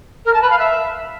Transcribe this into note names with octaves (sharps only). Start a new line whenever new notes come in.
A#4
A5
B4
F5
E5